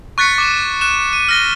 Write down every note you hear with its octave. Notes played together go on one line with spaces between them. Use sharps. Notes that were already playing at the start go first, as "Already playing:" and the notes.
C#6 F#6 A6 B6 C#7
D6 F#6 E7
F#6 E7
D#7
F6 A#6 G7